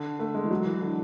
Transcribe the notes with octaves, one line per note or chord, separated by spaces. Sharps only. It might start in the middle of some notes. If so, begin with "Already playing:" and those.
Already playing: D3
A3
G#3
E3
F#3
E3
D3